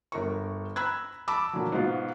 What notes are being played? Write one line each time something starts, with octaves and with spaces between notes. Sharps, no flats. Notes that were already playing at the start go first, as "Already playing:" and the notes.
G1 A#4 C#6
A#5 B5 E6 F#6 G#6
A5 B5 D6 E6
A#2 D3 F#3
G#2 B2 F4